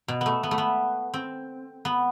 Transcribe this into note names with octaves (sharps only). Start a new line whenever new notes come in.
B2
A3 B3
B3
A3
B3
C4
B3